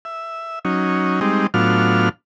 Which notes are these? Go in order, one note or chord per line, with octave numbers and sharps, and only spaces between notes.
E5
F#3 C#4 D#4
G3 G#3 C4 D#4
A2 F#3 B3 D4 F4 F6